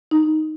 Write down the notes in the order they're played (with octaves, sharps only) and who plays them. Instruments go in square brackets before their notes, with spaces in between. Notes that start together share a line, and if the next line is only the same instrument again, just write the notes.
[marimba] D#4